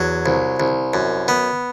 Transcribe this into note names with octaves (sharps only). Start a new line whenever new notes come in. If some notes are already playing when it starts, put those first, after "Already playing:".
Already playing: E2 F#3
C2
C2
F#2
B3